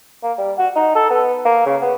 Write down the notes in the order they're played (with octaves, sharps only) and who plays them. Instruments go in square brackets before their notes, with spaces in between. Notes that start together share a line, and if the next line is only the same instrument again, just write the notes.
[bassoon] A#3
G3
F#4
D#4
A4
B3
A#3
C#3
B3